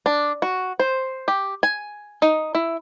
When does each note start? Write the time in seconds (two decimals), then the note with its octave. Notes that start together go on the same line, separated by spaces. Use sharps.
0.06 D4
0.42 F#4
0.80 C5
1.28 G4
1.63 G#5
2.22 D#4
2.55 E4